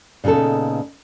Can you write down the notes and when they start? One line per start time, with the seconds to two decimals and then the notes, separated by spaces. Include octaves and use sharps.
0.24 A#2 C#3 B3 D#4 A4